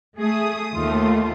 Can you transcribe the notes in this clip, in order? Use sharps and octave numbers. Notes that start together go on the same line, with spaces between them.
A3 G#4 D#6
D#2 A3 F4